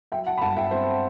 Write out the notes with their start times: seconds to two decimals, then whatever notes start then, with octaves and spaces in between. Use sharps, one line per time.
0.12 F#3 E5 G5
0.27 F#5 A5
0.38 B5
0.41 G1 F#5 A5
0.57 E5 G5
0.71 C4 C5 E5